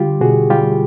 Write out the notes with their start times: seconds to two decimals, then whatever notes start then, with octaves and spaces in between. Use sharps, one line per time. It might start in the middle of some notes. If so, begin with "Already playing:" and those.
Already playing: D3 G3 F4 G4
0.21 B2 F#4 G#4
0.50 G3 F4 G4